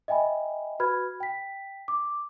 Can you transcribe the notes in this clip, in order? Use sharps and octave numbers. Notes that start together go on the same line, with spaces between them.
D#5 E5 G5 G#5 B5
F#4 B4 B5 F6 G#6
G5 B6
D6